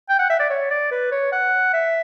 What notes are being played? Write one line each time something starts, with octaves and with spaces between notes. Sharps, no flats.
G5
F#5
E5
D5
C#5
D5
B4
C#5
F#5
E5